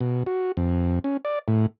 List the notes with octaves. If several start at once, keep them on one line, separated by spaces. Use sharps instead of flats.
B2
F#4
F2
C#4
D5
A2